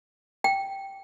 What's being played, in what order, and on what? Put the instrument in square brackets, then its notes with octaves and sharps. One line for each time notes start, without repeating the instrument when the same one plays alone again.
[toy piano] G5